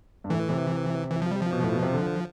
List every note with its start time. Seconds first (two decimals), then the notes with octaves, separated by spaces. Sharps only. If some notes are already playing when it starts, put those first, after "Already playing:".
0.24 G2
0.29 A2 E3
0.50 C3
1.11 E3
1.22 F3
1.31 G3
1.42 F3
1.53 B2
1.63 A2
1.72 B2
1.83 C3
1.93 D3